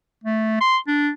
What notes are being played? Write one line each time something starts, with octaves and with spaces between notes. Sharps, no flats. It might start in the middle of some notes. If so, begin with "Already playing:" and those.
A3
C6
D4